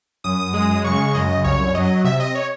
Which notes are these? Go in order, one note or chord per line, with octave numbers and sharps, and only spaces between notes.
F#2 D#6
G#3
C#3 C#6
F#2 D#5
C2 C#5
F#3 D#5
C3 E5
D#5
C#5